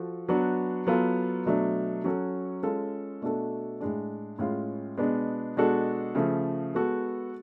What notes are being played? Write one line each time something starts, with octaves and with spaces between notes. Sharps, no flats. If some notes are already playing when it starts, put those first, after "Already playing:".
Already playing: F3 F#4 A4
F#3 B3 D4 F#4
F#3 B3 F4 A4
B2 F#3 A3 D4
F#3 C#4 F#4 A4
G#3 C#4 F4 A4
B2 A3 D4 F#4 A4
A2 G#3 D4
A2 G#3 C#4 F4
B2 G#3 B3 D4
B2 G#3 D4 F#4 A4
C#3 F3 A3
G#3 B3 F#4 A4